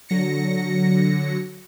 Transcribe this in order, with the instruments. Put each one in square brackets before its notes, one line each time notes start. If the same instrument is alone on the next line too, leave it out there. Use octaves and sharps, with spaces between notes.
[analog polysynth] D3 F#3 A#6 C#7